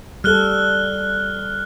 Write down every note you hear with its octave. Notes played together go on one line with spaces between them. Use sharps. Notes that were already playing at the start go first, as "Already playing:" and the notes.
G3 A4 F6 F#6 G7